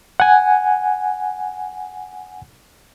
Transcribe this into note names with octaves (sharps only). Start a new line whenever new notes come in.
F#5 G#5